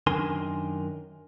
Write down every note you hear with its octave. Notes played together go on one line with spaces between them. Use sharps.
F#2 D#3 D4 A#4 G#5 C6